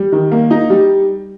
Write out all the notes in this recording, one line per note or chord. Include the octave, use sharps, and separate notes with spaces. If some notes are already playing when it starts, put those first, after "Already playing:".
Already playing: G3
D#3
A#3
D#4
G3